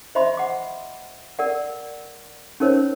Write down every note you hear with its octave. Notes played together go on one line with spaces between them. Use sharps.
C5 D#5 E5 B5 C6
F#5 D6
A#4 D5 F#5
C#4 D#4 A#4 C5 C#5